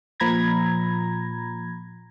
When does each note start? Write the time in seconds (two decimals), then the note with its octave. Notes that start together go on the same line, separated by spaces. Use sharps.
0.20 A#2 F3 A#5 B5 G#6 A#6